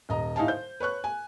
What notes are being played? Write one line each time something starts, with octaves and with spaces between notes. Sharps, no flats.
D#1 D#5 A#5
A2 D#4 E4 F5 G#5 A5
C5 G6
B4 C#5 C#6 F#6
G#5